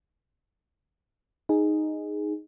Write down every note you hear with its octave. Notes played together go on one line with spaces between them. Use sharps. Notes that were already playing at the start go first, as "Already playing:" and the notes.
D#4 G#4